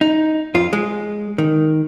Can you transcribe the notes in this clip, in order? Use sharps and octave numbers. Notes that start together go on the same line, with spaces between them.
D#4
F2 F4
G#3
D#3